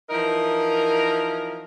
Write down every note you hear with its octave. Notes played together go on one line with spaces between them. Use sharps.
E3 F3 D#4 A#4